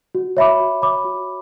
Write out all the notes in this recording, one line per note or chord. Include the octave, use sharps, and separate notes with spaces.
F#4
C#5 E5 B5 D6
F#4
C#5 E5 B5 D6
F#4